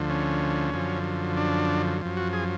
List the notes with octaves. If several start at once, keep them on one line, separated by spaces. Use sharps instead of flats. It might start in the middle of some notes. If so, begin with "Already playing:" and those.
Already playing: D2 D3 F3
C#4
F#2 D3 F3
D4
F#2 F3
F#4
G#4